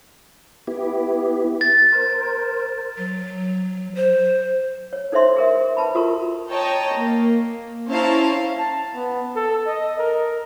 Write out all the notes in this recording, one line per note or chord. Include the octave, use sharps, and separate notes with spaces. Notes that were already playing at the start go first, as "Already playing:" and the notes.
B3 E4 G4
A6
A#4 C5
F#3
C5
C#5
D#4 A4 C5 C#5 E5 C6
G#4 A#4 E5
B4 A5 B5
F4 F#4 A4 A#4 C#6
C#5 D#5 G5 A5 A#5
A#3
C#4 E4 C5 F5 A5 A#5
A5
B3
A4
D#5
A#4